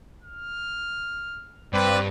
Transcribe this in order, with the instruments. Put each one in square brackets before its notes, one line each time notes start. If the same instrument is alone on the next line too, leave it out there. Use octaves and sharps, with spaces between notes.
[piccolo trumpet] F6
[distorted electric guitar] G2 [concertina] C4 D5 [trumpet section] B4